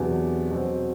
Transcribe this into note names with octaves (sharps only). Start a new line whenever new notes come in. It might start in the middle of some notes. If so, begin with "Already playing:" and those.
Already playing: E2 C3 F#3 B3 D4
B2 F#3 C4